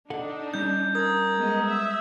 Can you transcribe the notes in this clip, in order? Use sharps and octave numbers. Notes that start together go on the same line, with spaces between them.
D4 D#4 A4 F#5
G3 C#4 G6
A#4 D#6 G#6
G#3 B3 D#5
E5